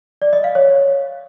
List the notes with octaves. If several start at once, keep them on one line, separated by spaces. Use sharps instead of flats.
D5
D#5
F5
C#5